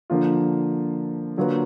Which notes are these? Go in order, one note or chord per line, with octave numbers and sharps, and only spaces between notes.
D3 F3 A#3 F4
D3 F#3 A#3 F4 B4